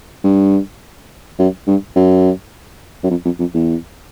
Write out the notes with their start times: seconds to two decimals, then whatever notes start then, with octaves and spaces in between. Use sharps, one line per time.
0.24 G2
1.39 F#2
1.67 G2
1.96 F#2
3.04 F#2
3.10 F2
3.25 F2
3.39 F2
3.54 E2